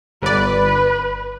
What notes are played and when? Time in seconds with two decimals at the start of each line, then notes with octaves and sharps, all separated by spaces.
0.23 G1 B4 D5